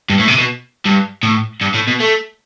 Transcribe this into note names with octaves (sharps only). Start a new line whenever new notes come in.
G2
A2
C3
B2
G2
A2
G2
A2
B2
A3